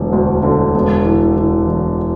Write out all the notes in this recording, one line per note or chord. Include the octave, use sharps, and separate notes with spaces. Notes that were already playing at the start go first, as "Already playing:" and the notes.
Already playing: E1 D2 D3 F#3
D2
D3
E1
E3
E3
E2